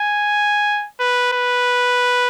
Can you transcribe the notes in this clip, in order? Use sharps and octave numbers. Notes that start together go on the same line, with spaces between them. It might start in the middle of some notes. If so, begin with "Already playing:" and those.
Already playing: G#5
B4
B4